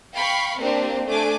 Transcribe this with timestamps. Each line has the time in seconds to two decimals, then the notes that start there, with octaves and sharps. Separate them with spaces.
0.14 F5 G5 B5 C#6
0.59 A#3 C4 D4 G4 C5
1.06 A3 D4 G#5 D6